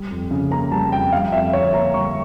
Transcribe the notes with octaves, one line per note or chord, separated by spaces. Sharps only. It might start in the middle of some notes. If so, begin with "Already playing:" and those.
Already playing: G3
F2
C#3
A#3 A#5
G3 A5
F2 G5
G3 F5
F2 E5
D3 C#5
A#3 A#5
G3 C#6